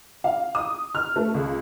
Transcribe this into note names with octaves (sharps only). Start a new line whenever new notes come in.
F5
D#6
F6
A3
C#2